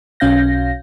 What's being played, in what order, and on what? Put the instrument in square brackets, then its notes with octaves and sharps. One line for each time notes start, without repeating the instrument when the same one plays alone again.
[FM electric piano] B1 C#4 F5 G6 A#6